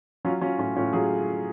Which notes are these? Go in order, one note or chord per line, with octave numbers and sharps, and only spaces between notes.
F#3 C#4 F4
F#3 C#4 F4
A2 C#4 F4
A2 C#4 F4
F#3 F4 G#4